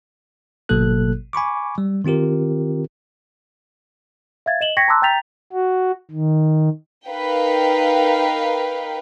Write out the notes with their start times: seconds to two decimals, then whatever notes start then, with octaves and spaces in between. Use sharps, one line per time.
0.69 G#1 B2 F#3 A#3 A4 F#6
1.33 G#5 B5 C#6 D6
1.78 G3
2.05 D#3 C4 F4 G4 A#4
4.46 E5 F5 G#6 A6
4.61 D#5 E7 F#7 G7
4.77 G5 C#6 G#6 A#6 B6 C#7
4.88 A5 A#5 C6 D6 E6 F#6
5.02 G5 A#5 G6 A6 B6 F7
5.53 F#4
6.12 D#3
7.09 D#4 A#4 B4 F5 G5